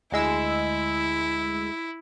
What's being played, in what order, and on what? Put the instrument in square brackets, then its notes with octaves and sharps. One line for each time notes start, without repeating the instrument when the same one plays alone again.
[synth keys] D2 G#3 E6 [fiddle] E4